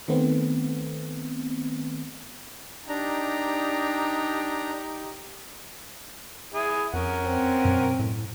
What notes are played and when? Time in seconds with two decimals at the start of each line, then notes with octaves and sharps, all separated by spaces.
0.08 D#3 A3 B3 C4
2.89 D4 D#4 G4 A#5
6.54 E4 G#4
6.94 F2 C#4 A#4 F#5
7.24 C4
7.65 F#2 B2
7.99 A2